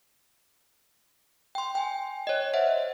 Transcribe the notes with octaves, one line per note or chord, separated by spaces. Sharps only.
G5 C6
G5 G#5
C#5 D#5
C5 E5 F#5